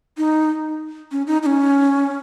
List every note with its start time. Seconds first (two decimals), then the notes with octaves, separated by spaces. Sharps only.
0.17 D#4
1.11 C#4
1.27 D#4
1.42 D#4
1.46 C#4